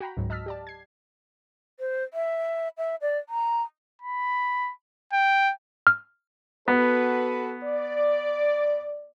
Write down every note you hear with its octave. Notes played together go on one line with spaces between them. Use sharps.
F#4 G5 A#5 B5
C#2 G#2 F#3
D#5 A5 E6 F6 B6
G4 D5 A5
G#6 C7
C5
E5
E5
D5
A#5
B5
G5
F6
B3 F#4 A4 B4
D5